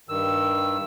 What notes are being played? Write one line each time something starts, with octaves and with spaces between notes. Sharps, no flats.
G2 D#3 E6